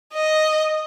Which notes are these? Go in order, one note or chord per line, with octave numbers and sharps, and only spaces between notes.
D#5